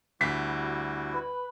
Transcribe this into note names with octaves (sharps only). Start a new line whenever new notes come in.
D2 G3 E4 F#4 B6
B4